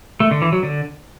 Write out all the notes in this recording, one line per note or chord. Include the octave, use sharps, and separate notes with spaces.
A3
D3
E3
F#3
D3